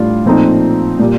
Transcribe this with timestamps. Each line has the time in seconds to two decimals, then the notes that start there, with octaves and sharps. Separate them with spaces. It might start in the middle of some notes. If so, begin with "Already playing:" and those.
Already playing: A2 G3 D4 F4
0.26 A#2 F3 A3 C4 D#4
0.99 A#2 G3